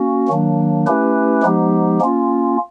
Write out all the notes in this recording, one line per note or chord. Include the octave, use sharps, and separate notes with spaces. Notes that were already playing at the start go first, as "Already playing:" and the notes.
Already playing: A#3 C#4 F#4
D#3 F#3 A#3 D4
A3 C#4 E4 G4 B4
F3 G#3 B3 D#4 G4
A#3 C#4 F4